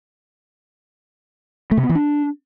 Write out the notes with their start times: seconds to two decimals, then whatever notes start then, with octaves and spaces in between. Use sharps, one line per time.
1.71 A3
1.77 C3
1.83 B3
1.89 E3
1.95 D4